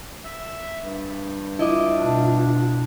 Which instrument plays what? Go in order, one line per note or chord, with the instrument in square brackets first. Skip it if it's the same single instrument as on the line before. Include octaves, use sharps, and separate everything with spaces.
[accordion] E5
G2
[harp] E4 D#5 D6 [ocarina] F4
[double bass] B2 D4